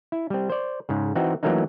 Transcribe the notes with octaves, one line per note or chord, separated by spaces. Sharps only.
E4
G3 C4
C5 D5
G#2 C#3
E3 C4 D#4 F#4
E3 F#3 A3 A#3 C#4 D#4